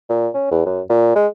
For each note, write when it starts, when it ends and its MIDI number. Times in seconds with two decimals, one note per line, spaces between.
0.09 0.28 46
0.34 0.47 61
0.51 0.62 40
0.66 0.81 42
0.89 1.15 46
1.15 1.27 56